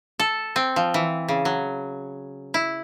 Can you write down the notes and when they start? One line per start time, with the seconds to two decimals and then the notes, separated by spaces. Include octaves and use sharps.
0.20 A4
0.56 C4
0.76 F3
0.94 E3
1.28 C#3
1.45 F#3
2.54 E4